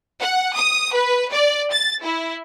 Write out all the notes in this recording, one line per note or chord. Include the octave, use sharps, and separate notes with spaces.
F#5
D#6
B4
D5
A6
E4